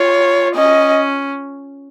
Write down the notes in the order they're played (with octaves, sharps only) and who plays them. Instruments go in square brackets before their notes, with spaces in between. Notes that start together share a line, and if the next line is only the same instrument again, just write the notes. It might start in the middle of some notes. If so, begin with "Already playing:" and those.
Already playing: [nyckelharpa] F4 [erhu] C#5
[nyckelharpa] C#4 [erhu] D#5